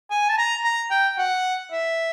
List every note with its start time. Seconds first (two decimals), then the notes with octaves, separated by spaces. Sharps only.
0.11 G#5
0.29 A5
0.38 A#5
0.64 A#5
0.91 G5
1.18 F#5
1.72 E5